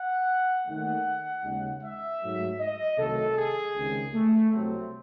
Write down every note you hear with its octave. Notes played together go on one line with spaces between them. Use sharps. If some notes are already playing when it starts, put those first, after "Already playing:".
Already playing: F#5
D#2 D#3 A3 F#5
D#2 C#3 G#3
E5
G#2 F#3 A3
D#5
C2 C3 D#3 F#3 A3 A4
G#4
C#2 C3 D#3 G#3
A3
C2 C3 F#3 A3 C4